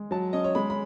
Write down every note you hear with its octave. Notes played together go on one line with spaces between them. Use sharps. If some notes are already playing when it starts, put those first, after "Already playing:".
Already playing: G#3
F#3 A5
C#4 D#5
C#5
G#3 B5
B5